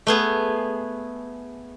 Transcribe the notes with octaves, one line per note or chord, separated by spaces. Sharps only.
A3 B3 G#4